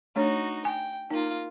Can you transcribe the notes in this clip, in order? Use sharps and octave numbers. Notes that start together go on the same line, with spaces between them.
A3 D4 D#4 F#4 C#5
G5 G#5
A#3 D#4 F4